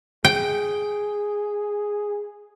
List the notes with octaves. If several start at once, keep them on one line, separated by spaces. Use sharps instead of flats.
G#4 G5